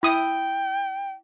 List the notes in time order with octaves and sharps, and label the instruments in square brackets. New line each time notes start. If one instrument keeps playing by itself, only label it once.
[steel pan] E4 D#6 [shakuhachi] G5